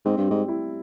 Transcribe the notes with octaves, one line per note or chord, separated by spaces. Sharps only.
G#2 C4
G2
G#2 G3
E4